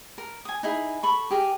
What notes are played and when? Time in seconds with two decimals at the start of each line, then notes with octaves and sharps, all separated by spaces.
0.18 A#4
0.45 G#5 D#6
0.63 D#4 E4 G#4
1.03 A4 B5 C#6
1.31 G4 G#4 A#4